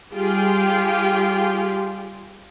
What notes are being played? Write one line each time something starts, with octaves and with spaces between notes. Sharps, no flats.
G3 F4 G4 G#4 G5